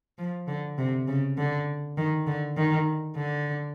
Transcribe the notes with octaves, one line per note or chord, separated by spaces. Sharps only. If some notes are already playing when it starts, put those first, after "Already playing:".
F3
D3
C3
C#3
D3
D#3
D3
D#3
D3